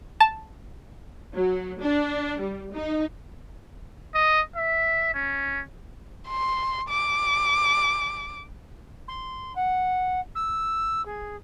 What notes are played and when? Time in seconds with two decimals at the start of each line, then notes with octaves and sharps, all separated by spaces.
0.20 A5
1.35 F#3
1.80 D4
2.40 G3
2.74 D#4
4.15 D#5
4.56 E5
5.14 C#4
6.29 C6
6.89 D6
9.08 C6
9.55 F#5
10.35 E6
11.05 G#4